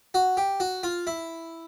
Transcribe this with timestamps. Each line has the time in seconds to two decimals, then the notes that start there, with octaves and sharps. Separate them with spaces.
0.14 F#4
0.37 G4
0.60 F#4
0.83 F4
1.07 E4